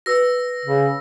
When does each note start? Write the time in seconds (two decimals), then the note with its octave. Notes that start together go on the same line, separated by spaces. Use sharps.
0.06 F#4 B4 E6 A#6
0.65 C#3